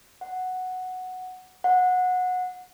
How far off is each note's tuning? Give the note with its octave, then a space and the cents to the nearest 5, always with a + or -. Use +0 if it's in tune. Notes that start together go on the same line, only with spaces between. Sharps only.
F#5 +0
F#5 -20